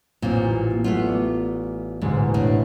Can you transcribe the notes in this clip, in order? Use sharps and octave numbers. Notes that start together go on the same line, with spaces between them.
A1 A#2 C4
A3 B3 F4
D5
A1 D2 G#2 B2
A2 D4